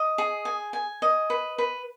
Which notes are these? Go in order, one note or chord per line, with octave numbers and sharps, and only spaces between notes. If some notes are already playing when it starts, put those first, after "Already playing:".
Already playing: D#5
G#4
G#5
G#5
D#5
B4
B4